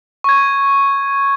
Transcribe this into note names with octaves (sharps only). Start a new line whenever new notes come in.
C#6 G#6